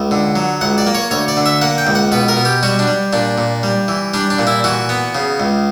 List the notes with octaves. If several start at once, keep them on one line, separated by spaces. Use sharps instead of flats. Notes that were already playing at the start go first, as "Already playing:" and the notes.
Already playing: C#2
D3
F#3
C#2 F#5
D5
A#3
C#5
D2 C#5
D5
D3
E5
A#3 F#5
G5
C#2
F#5
B2 B4
A#4
B2
G4
G3 F#4
D4
G3
A#2 D4
A#2
G3
E3
G3 D4
D4
A#2
E4
E3 F#4
B3
C#3
C#2